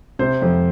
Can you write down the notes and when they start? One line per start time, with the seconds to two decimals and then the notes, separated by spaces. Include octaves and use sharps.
0.19 C3 C5
0.42 F2